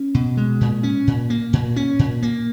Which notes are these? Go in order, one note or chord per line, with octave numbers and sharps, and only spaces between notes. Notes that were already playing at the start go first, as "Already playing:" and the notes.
Already playing: C#4
B2
G#3
A#2
C#4
A#2
A#3
A#2
C#4
A#2
A#3